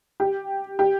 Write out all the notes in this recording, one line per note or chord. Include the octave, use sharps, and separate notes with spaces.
G4
G4